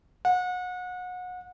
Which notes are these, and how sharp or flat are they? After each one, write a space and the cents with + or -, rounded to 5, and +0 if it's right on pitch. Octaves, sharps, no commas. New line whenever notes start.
F#5 -30